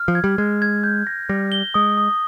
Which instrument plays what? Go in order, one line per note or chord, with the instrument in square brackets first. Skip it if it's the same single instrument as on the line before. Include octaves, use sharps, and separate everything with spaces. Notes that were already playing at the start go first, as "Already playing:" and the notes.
Already playing: [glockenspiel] F6
[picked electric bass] F3
[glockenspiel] G#6
[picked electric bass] G3
[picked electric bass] G#3 [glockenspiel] G#6
[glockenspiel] G#6
G6
A#6
[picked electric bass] G3 [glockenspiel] A#6
[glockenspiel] G7
[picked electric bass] G#3 [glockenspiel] D#6
[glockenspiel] D#6